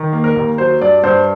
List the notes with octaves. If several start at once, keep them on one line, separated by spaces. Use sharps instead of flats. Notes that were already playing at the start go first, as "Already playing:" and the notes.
Already playing: D#3
A#3
A#4
D#2
F#3 C5
G2 D5
G2 C5